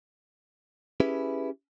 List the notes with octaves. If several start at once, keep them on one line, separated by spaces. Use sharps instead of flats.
C#4 E4 G4 G#4 B4